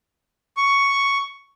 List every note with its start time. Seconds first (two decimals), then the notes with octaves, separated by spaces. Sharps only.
0.57 C#6